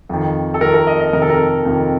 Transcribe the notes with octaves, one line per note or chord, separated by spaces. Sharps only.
F2 D#3
A4
F2 D#3 A#4
A#4
D#5
D#5
F2 C3 D#3 A#4
A4
A#4
F2 C3 D#3